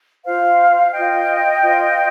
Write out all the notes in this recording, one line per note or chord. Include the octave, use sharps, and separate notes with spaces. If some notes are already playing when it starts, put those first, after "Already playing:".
F4 C5 F5
F4 C5 D#5 G5
F4 C5